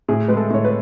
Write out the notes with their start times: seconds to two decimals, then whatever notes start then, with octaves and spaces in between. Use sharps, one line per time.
0.08 A2 G#4
0.28 G#3 B4
0.37 A4
0.50 A2 C#5
0.65 B4